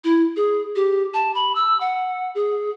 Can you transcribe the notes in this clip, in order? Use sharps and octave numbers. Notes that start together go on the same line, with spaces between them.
E4
G#4
G4
A5
B5
E6
F#5
G#4